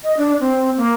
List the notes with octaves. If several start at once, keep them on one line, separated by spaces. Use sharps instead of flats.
D#5
D4
C4
A#3